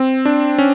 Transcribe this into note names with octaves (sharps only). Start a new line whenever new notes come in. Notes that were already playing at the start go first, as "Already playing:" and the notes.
Already playing: C4
D4
C#4